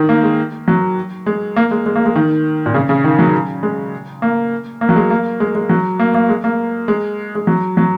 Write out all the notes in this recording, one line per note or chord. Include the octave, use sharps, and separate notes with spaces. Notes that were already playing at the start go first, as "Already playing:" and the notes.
Already playing: D#3
A#3
G#3
F#3
G#3
A#3
G#3
G#3
A#3
G#3
D#3
A#2
C#3
C#3
D#3
F#3
G#3
A#3
A#3
F#3
G#3
A#3
G#3
G#3
F#3
A#3
A#3
G#3
A#3
G#3
G#3
F#3
F#3